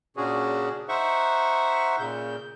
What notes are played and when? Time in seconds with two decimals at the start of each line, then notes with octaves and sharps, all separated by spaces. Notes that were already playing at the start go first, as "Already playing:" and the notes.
0.17 A#2 C#3 C#4 D4 F#4 G#4
0.89 D#4 C5 E5 F#5 C#6
1.99 A#2 C#3 G6